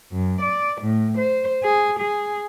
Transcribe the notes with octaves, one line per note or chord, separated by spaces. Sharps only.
F#2
D5
A2
C5
G#4
G#4